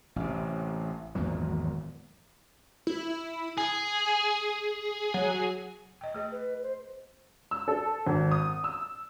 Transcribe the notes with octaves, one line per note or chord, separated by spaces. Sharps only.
A1 C3
G#1 E2 A#2 F#3
E4
G#4 D#6
F#3
D#5 G5
A3 G#4 D#5
B4
C5
E6
A4
G#1
D#6
E6